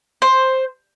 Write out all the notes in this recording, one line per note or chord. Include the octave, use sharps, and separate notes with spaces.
C5